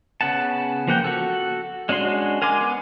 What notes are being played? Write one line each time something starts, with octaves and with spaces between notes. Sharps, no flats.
C#3 B3 F#5 A5
F3 A#3 F#5 G5
F#4 A4
G#3 C#4 D4 F#4 C6
A#4 G#5 C6 D6
B3